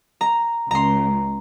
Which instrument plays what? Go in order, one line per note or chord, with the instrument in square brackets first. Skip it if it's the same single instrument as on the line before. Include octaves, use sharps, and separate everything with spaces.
[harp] A#5
[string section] C#2 [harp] A#5 C6